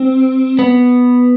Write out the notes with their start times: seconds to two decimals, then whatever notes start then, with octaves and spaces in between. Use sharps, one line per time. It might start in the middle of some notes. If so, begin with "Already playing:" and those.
Already playing: C4
0.59 B3